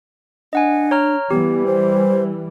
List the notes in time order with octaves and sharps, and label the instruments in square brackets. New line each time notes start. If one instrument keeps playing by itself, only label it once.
[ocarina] D4 [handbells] D#5 F#5 G#5
[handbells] C#5 A#5 F6
[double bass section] E3 G3 [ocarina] B3 [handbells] G4
[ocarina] C5